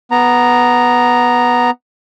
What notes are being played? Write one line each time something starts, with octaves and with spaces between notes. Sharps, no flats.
B3 A#5